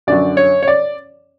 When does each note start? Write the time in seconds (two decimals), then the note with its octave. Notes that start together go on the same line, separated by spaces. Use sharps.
0.07 F#2 D3 F#3 D5
0.37 C#5
0.63 C#5
0.68 D5